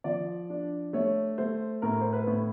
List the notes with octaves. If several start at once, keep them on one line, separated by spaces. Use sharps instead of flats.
F3 D5
D4
A3 C#5
A3 C5
A2 A#4
C5
B4
A2